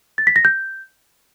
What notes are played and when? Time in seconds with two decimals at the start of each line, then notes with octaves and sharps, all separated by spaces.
0.18 A6
0.27 B6
0.36 A#6
0.45 G6